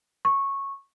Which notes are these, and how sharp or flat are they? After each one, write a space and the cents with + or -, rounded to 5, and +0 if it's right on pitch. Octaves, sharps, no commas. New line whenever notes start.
C#6 -10